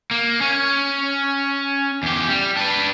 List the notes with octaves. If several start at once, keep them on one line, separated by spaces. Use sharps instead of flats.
A#3
C#4
E2 G4
G3
D4 B4